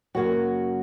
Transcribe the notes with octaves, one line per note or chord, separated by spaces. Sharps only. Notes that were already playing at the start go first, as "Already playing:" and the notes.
F#2 C#3 F#3 A#3 F#4